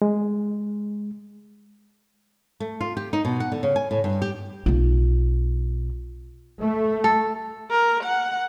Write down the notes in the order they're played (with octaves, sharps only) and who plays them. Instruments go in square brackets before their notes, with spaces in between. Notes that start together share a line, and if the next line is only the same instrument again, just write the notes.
[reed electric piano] G#3
[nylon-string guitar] A3
F4
G4
D#4
B2
F#5
D3
C#3
G#5
A2
G2
G4
[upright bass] B1 F4
[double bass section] A3
[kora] A4
[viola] A#4
F#5